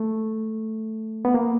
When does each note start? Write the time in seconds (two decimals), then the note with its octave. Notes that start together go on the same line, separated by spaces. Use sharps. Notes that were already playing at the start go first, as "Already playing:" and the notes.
Already playing: A3
1.25 B3
1.34 A#3